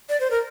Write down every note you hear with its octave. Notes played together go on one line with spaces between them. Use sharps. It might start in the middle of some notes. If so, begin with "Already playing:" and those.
D5
C5
A#4